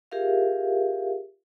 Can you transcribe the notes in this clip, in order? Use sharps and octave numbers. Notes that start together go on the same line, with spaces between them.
F4 G4 G#4 A#4 E5 F5